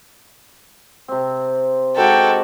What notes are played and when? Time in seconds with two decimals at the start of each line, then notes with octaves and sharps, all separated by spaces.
1.08 C3 C4
1.97 G#3 D#4 F#4 G4 A4 G5